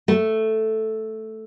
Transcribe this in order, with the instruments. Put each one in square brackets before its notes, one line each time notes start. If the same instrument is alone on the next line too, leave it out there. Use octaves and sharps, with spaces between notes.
[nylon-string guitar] A3